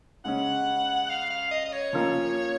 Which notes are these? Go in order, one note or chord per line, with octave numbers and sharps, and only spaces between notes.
C#3 G#3 C#4 F#5
F5
F5
D#5
D#5
C#5
F3 A#3 C#4 F4